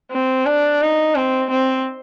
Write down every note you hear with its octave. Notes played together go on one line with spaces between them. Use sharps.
C4
D4
D#4
C4
C4